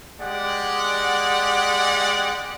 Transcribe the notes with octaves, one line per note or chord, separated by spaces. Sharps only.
G#3 G4 D5 F#5